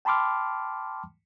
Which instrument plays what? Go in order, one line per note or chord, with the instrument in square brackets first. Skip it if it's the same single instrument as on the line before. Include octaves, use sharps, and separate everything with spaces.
[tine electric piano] G5 A5 B5 C6 D6 F6